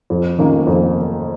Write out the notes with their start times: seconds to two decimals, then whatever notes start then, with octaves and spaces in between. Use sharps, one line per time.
0.10 F2
0.39 D#3 A#3 C#4 F4
0.67 F2